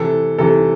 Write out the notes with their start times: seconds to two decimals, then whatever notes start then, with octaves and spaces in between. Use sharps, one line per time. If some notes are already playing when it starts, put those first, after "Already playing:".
Already playing: C3 E3 A4
0.38 C3 E3 A4